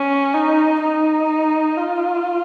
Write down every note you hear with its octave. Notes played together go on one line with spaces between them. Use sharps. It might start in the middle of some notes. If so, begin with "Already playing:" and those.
Already playing: C#4
D#4
D#4
F4